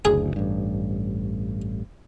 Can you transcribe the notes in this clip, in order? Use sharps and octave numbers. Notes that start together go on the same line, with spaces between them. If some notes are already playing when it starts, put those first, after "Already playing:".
F#1 D2 G#4
A1 G2